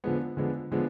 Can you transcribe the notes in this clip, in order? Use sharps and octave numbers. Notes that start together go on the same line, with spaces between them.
D3 F3 G#3 B3
D3 F3 G#3 B3
D3 F3 G#3 B3